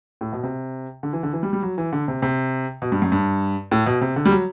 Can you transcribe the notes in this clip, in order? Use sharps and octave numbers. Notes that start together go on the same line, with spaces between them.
A2
B2
C3
D3
E3
D3
E3
G3
G3
F#3
E3
D3
C3
C3
B2
G2
F#2
G2
A2
B2
C3
D3
G3
F#3